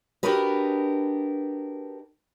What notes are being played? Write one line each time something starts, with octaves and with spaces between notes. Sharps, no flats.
D4 F#4 G4 A#4 B4 D#5